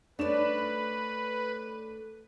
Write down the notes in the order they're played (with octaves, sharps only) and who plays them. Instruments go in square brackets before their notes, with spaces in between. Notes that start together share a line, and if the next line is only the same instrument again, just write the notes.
[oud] A3 D5 [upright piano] D4 C#5 E7 [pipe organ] B4